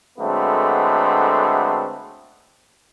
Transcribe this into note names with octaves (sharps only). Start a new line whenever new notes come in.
D3 F#3 G#3 A3 B3 C4